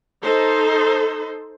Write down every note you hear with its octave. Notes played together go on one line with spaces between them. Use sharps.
D#4 A4 C5